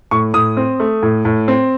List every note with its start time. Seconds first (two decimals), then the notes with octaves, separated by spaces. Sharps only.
0.11 A2 C#6
0.34 A2 D#6
0.57 C4
0.80 A3
1.03 A2
1.25 A2
1.48 C4